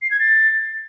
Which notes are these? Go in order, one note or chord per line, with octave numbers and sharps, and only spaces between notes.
C7
G#6
A6